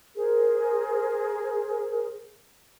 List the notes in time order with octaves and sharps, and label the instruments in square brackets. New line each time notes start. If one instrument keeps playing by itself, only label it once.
[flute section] G#4 A#4 C5